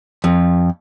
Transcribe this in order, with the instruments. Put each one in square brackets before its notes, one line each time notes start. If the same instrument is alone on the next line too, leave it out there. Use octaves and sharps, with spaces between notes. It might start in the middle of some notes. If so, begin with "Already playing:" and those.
[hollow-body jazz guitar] F2